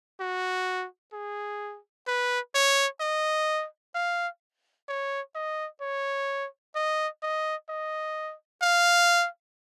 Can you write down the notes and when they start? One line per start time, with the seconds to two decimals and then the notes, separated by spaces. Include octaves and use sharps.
0.20 F#4
1.13 G#4
2.07 B4
2.55 C#5
3.00 D#5
3.95 F5
4.88 C#5
5.35 D#5
5.81 C#5
6.75 D#5
7.23 D#5
7.69 D#5
8.62 F5